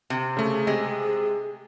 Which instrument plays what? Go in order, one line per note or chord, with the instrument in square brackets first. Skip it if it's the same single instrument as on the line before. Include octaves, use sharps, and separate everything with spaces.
[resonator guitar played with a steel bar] C3
[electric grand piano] C#3 A3 [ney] G#4
[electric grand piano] C3 [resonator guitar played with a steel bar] G#3